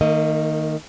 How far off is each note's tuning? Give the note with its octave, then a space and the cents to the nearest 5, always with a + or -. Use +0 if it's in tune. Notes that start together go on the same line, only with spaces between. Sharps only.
D#3 +0 A#3 -40 D#5 +0